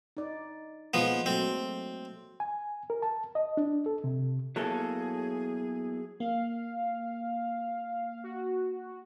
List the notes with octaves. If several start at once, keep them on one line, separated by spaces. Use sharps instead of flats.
D#4 D5
F3 G#3 A#3 B3
F#3 A3 C4
G#5
A#4
A5
D#5
D4
A4
C3
F#3 A#3 B3 E4 G#4 A4 C#5
A#3 F5
F#4